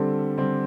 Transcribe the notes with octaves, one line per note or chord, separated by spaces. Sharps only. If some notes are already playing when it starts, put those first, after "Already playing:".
Already playing: D3 G3 C4 A4
D3 G3 C4